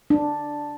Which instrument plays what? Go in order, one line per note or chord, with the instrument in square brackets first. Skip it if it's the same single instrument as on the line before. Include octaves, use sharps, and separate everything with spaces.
[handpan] D4